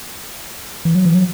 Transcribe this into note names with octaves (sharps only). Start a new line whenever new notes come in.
E3
F#3
E3
F#3